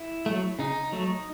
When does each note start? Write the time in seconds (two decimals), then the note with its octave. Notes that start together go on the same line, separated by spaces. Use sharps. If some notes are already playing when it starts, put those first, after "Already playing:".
Already playing: E4
0.26 F#3 A3
0.59 C#3 D#4
0.92 F#3 A3